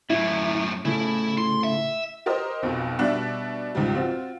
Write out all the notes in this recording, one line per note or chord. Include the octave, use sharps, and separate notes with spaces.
F#2 A2 E4
A2 C#3 E4
C6
E5
G4 A#4 C5 D#5
B1 F2 B2
B2 G3 D4 E5 F#6
C#2 G#2 F3 G3
C4 F4 F#4